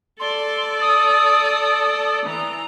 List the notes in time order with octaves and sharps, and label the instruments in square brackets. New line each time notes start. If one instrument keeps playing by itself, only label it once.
[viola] A4 D5 [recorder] C6
[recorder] D#6
[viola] E3 A#5